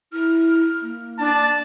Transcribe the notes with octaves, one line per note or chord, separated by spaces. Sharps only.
E4 F6
A#3
D4 A5